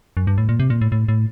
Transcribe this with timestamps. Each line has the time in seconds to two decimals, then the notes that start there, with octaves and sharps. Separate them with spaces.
0.17 F#2
0.27 G2
0.38 A2
0.49 A#2
0.60 C3
0.70 A#2
0.81 A2
0.92 A2
1.08 A2